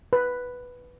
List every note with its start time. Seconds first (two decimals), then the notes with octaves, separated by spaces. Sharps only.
0.13 B4